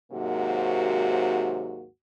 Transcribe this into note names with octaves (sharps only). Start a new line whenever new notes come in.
D#2 G#2 C3 F#3 A#3 F#4